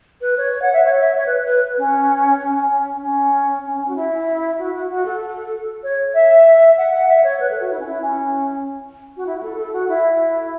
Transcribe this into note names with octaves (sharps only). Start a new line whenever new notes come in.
B4
C#5
F#5
E5
C#5
E5
C#5
B4
B4
C#4
C#4
C#4
C#4
C#4
F#4
E4
F#4
F#4
F#4
A4
C#5
E5
F#5
F#5
E5
C#5
B4
A4
F#4
E4
C#4
E4
C#4
F#4
E4
F#4
A4
A4
F#4
E4